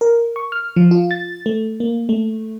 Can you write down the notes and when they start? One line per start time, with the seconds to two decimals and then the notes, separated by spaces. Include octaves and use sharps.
0.01 A#4
0.36 C#6
0.52 F6
0.76 F3
0.91 F4
1.11 A6
1.46 A3
1.80 A#3
2.09 A3